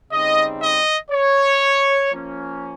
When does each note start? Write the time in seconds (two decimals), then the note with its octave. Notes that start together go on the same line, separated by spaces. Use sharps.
0.11 C#3 G3 C4 D#4 D#5
0.61 D#5
1.11 C#5
2.12 F3 A#3 C#4